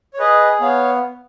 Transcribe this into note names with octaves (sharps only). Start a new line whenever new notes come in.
C#5
G#4 B4 D#5
B3 C#5 F5